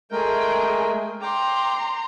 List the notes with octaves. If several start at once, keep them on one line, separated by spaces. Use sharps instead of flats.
G#3 A3 G#4 A#4 G5
G5 A#5 C6 D6